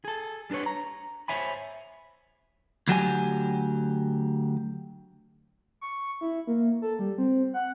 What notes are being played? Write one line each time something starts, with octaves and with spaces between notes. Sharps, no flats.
G#4 A4
G3 D4 A4 B4 C#5
A#5
C5 C#5 E5 G#5 B5
D2 F#3 G4 G#5
C#6
E4
A#3
A4
G3
C4
F#5